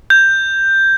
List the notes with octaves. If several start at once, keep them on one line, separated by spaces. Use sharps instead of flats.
G6